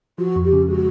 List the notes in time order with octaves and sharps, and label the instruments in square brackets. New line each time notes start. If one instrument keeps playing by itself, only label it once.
[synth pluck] F3 [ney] F#4
[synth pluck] F2
[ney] G4
[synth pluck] C#3
[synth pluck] G#3 [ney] F#4